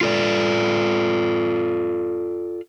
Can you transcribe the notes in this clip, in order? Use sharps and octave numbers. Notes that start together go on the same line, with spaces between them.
F4 A4 D5